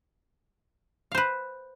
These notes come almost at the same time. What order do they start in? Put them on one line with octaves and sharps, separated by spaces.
F5 C5 B4